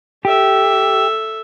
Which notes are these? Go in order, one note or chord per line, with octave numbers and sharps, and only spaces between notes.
G4 A4 E5